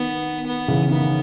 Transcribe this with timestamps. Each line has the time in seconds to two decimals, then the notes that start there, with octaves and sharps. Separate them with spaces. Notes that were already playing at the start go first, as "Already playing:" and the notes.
Already playing: D#3 B3
0.47 B3
0.68 C#3 E3
0.90 D#3 B3